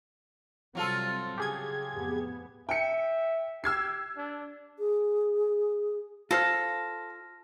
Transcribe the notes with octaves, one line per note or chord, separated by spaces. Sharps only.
C3 F#3 G3 C4 F4 A4
C#3 G4 G#4 G#6
F2 A2 B3
E5 G5 C#7
G4 E6 G#6 C7
D4
G#4
F4 A4 C5 F6 A#6